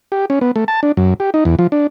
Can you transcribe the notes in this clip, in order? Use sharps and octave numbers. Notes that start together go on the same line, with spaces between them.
G4
C#4
B3
A3
A5
D4
F#2
G4
D#4
E2
F3
D4